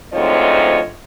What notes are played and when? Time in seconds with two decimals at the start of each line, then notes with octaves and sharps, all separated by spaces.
0.13 D2 G#2 F3 C4 C#5 D#5